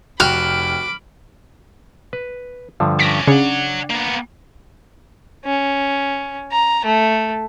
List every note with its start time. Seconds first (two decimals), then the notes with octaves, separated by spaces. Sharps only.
0.20 F1 F#4 G5 B5 D6 F6 F#7
2.13 B4
2.80 G2 D3 F3
2.99 C#4 D5 A#6 B6
3.27 C#3 D4 C#5 F#5
3.90 A#3 B3
5.45 C#4
6.52 A#5
6.85 A3